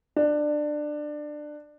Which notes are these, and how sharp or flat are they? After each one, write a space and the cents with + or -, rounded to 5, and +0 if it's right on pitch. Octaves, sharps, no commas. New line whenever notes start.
D4 +20